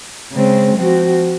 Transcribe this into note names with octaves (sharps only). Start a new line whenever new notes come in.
C#3 G#3 C4
F3 C4 F#4